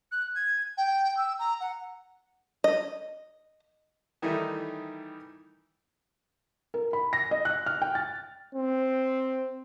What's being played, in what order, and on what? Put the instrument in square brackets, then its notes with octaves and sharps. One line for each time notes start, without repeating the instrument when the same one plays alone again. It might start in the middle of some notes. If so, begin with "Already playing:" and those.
[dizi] F#6
G#6
G5
E6
A#5
F#5
[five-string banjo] D#5
[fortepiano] D#3 E3 G3 A3 D#4 E4
[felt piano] A#4
B5
A#6
D#5
F#6
F6
G5
A6
[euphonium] C4